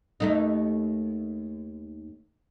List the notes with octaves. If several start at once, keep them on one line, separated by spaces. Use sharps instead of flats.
D#2 A3 D#4